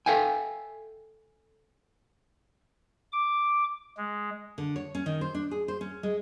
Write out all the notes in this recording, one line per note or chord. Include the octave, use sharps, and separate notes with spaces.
A4 E5 F5 G5 G#5
D6
G#3
D3
C#5
C#4
D#3
C5
D4
G#4
C5
C#4
G#3